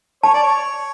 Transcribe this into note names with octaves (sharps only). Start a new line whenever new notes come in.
C#5 A5
D5
C#5